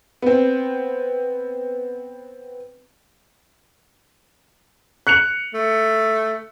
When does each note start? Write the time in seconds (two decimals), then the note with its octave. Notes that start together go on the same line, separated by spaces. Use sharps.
0.22 B3 C4
5.07 F#6 C#7 F7
5.54 A3